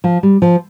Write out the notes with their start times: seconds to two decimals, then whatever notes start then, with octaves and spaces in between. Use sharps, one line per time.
0.04 F3
0.23 G3
0.42 F3